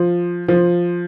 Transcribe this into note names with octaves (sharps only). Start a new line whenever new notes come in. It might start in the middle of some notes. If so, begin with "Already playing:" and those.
Already playing: F3
F3